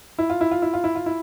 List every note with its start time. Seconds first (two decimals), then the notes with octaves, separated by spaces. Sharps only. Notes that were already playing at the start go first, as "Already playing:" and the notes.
0.19 E4
0.30 F4
0.41 E4
0.51 F4
0.62 E4
0.73 F4
0.84 E4
0.95 F4
1.06 E4